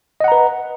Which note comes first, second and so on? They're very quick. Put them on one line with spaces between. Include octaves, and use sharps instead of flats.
D#5 F#5 A#5 B4